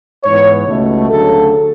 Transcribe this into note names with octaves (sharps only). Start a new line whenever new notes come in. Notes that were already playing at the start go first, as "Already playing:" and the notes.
G#2 E3 B3 C#5
C#2 B2 A3
D2 C#3 F#3 A4